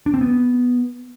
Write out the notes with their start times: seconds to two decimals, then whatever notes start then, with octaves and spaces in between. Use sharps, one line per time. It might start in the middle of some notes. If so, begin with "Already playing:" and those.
0.06 D4
0.14 C4
0.21 B3